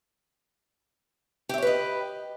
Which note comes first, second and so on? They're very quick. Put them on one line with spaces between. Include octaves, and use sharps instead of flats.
G4 E5 C#5 B4 D#5